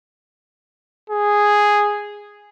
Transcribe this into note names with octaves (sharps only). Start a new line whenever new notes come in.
G#4